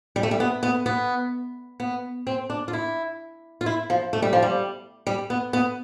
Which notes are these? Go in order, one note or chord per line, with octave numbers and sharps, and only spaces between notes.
G3
A3
G3
B3
B3
B3
B3
C4
D4
F4
E4
F4
E4
F3
A3
G3
F3
G3
G3
B3
B3